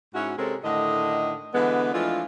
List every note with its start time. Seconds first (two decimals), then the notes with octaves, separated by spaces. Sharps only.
0.14 G#2 C#4 E4 F#4
0.37 C3 G#3 C4 C#4 A4 A#4
0.64 A2 D3 D#3 D#5
1.54 D3 E3 G#3 B3
1.93 E3 F3 G#3 A3 D4 F4